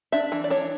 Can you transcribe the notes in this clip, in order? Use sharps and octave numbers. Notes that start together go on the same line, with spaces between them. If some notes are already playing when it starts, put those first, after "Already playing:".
D4 E5
E3
D5
D4 C#5